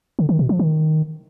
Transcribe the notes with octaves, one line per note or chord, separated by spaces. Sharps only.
D3
D#3
B2
F3
D#3